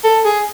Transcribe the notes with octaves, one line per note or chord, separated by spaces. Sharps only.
A4
G#4